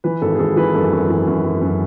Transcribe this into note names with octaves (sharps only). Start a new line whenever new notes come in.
E3 B4
G#1 A4
G#4
G#1 A4
E3 B4
F#2 A4
F#2
E3
F#2
F#2
F#2